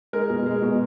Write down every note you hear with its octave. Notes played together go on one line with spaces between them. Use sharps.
G#3 A#4
B2
G#3
B2